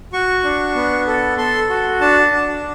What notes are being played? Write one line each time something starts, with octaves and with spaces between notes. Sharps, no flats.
F#4 C#6
D4
B3
A4
A4 C6
F#4
D4 A5
D4